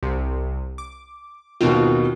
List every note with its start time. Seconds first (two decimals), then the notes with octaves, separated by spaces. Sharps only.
0.03 C2 C3
0.78 D6
1.61 D#2 B2 D#3 C4 F4